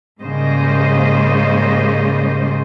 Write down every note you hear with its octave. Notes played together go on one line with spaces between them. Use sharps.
G#2 C#3 G3 A#3 C5 D#5